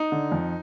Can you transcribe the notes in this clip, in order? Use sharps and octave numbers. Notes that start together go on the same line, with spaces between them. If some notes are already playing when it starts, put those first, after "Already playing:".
Already playing: D#4
D3
F2